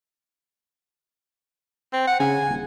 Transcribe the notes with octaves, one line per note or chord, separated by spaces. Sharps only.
C4
F#5
C#3 G#5
D#1